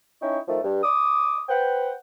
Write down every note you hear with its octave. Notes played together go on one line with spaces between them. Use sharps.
C#4 D#4 E4 G5 C#6
D#3 F3 A3
G2
D6 D#6
B4 C5 F#5 G5